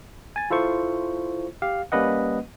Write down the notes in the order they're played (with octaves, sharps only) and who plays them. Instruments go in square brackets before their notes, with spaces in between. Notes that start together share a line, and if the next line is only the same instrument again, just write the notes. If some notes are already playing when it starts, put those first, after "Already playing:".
[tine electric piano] G#5 A6
E4 F4 A4 C5 C#6
G4 F5
G3 A#3 C#4 B4 D#5 F#5